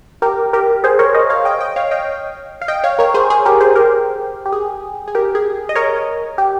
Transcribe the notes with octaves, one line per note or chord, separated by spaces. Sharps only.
G4 A#4
G4 A#4
G#4 C5
A#4 C#5
C5 D#5
C#5 F5
D#5 G5
D#5 G5
C#5 F5
D#5 G5
F5
D#5 G5
C#5 F5
A#4 C#5
G#4 C5
G#4
G4 A#4
G#4 C5
G4 A#4
G4
G#4
G#4
G4 A#4
G#4
D#5
A#4 C#5
G4